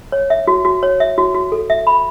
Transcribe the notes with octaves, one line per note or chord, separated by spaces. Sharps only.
C#5
E5
F#4
F#4
C#5
E5
F#4
F#4
A4
E5
B5